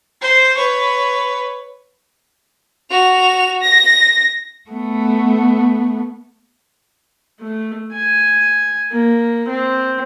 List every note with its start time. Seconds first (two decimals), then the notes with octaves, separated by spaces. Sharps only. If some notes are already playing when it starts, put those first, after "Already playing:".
0.22 C5
0.57 B4 C#5
2.91 F#4 F7
3.62 A#6
4.70 A3 B3
7.40 A3
7.93 G#5
8.92 A#3
9.48 C4